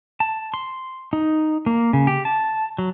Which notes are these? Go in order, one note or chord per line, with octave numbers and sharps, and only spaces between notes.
A5
C6
D#4
A#3
C#3
G4
A5
F#3